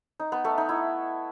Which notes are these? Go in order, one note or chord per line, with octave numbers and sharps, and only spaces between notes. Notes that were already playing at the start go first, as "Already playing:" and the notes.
D#4
B3
A3
D#4
E4